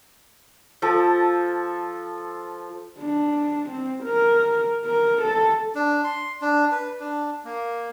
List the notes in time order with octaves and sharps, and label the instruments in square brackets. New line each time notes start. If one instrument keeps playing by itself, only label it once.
[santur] F3 A4
[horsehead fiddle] D4
C4
A#4
A#4
A4
[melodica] D4
C6
D4
B4
D4
A#3